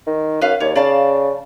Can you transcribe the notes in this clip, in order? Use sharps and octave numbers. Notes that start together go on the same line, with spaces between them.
D#3
F#2 B4 F5
D#2 C#5 D5
C#3 D5 F5 A5